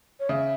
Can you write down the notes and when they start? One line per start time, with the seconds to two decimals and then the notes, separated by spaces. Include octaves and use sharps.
0.20 C#5
0.29 C#3 E5